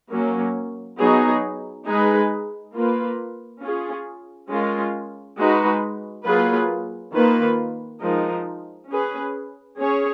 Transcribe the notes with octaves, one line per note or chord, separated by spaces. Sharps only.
F#3 A#3 C#4
F#3 B3 D#4 G#4
G#3 D#4 G#4 B4
A#3 F4 B4
C#4 F4 G#4
G#3 C#4 F4 A#4
G#3 D#4 F#4 B4
F#3 A#3 F4 G#4 B4
D#3 A#3 F4 B4
F3 G#3 D#4 A#4
C#4 G#4 B4
C#4 G#4 C#5